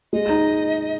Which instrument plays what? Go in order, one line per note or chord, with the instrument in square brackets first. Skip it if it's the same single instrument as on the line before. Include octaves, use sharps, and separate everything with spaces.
[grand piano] G#3 [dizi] D#5
[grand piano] D#4